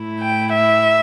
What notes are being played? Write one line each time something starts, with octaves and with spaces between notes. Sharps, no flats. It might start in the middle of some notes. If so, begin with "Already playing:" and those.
Already playing: A2 A3 E4
G5
E5